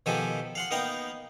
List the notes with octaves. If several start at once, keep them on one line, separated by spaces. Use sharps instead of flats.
B2 D#3 F3 G4 A4 G#5
F5 F#5 C6
A#3 B3 D#4 F5 G5 A#5